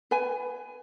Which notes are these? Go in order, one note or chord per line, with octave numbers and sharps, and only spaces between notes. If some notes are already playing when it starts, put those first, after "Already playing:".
B4 G#5